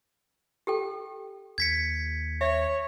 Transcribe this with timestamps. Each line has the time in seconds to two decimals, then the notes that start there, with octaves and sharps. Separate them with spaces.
0.67 G4 A4 G5
1.58 D#2 G#6 B6 C#7
2.41 C#5 E5